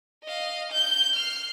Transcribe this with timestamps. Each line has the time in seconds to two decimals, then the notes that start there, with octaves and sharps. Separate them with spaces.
0.24 D#5 F5
0.72 G6
1.15 F6 C7